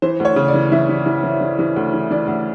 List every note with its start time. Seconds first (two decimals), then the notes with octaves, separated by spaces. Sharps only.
0.02 E3 C5
0.20 D2 C#5
0.36 C#3
0.48 D5
0.54 E3
0.72 E3 E5
0.89 E3
1.06 E3
1.24 E3
1.41 E3
1.59 E3
1.76 D2
1.93 E3
2.11 E3 D5
2.28 D2